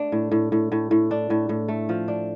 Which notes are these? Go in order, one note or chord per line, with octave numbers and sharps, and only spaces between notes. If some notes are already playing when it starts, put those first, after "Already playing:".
Already playing: A3 D4
A2
A2
A2
A2
A2
D4
A2
A2
A3
F3
D4